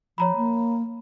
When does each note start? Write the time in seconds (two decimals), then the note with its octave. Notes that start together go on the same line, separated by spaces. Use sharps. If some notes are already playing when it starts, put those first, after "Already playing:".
0.18 F3 C#5 A#5 B5
0.36 A#3